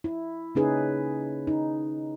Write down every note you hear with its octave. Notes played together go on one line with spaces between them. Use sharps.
E4
C#3 A#3 C#4 D#4 G#4 B4
D#4